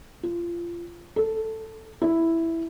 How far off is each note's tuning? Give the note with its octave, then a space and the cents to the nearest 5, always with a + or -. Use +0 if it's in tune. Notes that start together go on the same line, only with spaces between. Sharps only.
F4 -25
A4 +5
E4 +0